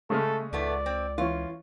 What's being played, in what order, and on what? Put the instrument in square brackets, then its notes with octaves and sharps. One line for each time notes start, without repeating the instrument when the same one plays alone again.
[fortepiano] C#3 G#3 F6 [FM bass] A3 [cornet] A4
[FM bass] C#2 [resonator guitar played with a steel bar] G#2 A3 B3 [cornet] D5
[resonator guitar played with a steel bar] C4
[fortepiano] E3 C#4 [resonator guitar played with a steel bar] F4